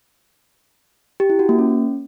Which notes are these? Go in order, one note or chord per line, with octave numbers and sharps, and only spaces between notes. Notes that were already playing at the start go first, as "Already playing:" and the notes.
G4
E4
F#4
A#3
C#4